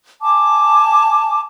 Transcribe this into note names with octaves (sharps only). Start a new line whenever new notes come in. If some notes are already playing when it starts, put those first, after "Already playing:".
G#5 A5 D6